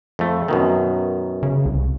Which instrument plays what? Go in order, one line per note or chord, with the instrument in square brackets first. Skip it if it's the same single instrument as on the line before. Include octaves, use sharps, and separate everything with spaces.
[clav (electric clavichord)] F2 A3
F#2 B2 D#3
[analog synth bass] C#3
C2